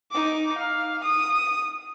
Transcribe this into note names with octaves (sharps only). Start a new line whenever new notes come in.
D#4 D6
F5
D#6